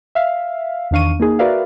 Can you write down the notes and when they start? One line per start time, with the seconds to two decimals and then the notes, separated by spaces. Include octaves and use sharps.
0.15 E5 F5
0.91 E2 D#3 D4 F5 C#6 D#7
1.20 A#3 D#4 G#4
1.39 F#4 A#4 B4 D5 E5 F5